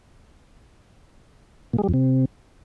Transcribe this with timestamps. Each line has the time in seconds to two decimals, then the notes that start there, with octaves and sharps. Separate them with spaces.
1.73 A#2
1.78 G#3
1.84 G3
1.89 F2
1.94 C3